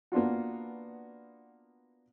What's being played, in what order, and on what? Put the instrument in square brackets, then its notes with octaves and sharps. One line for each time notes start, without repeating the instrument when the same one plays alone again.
[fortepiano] A#3 B3 D4 F4 F#4